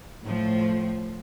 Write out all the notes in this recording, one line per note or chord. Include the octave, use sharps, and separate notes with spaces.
A2 F3